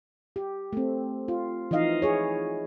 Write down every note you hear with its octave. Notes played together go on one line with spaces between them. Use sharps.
G4
A3 C4
F4
E3 F3 D#4 D#5 F5
E4 G#4 C#5